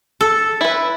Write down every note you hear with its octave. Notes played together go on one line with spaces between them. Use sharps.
A4
E4 B4